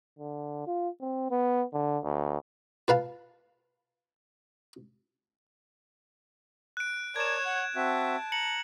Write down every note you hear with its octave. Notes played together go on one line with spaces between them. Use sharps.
D3
F4
C4
B3
D3
D2
F4 B4 F5 A5
F#6 D7
A#4 C#5 D5 A5 G#6 E7
F#5
C4 F#4 E5 A5
A#5 C#7 F#7